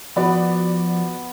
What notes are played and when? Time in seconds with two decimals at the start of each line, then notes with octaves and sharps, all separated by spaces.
0.16 F3 B3 F#4 D5 B5